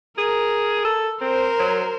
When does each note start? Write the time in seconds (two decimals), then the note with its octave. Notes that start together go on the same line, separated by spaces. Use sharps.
0.18 G#4 A#4
0.85 A4
1.21 C4 A#4 C5
1.59 F#3